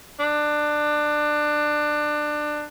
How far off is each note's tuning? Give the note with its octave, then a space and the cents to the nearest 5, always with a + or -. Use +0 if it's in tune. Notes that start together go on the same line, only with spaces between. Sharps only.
D4 +20